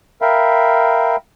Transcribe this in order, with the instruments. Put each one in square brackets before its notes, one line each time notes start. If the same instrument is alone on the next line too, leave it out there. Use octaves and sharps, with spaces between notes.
[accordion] A#4 E5 F5 G5 B5